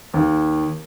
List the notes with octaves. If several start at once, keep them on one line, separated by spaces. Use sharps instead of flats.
D#2